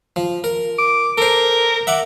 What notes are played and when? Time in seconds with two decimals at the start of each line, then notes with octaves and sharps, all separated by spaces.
0.16 F3
0.44 A#4
0.79 D6
1.18 A4 A#4 C5
1.87 E5 F#5 D6